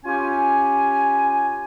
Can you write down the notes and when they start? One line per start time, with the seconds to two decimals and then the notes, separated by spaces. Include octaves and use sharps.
0.05 C#4 F4 G4 G#5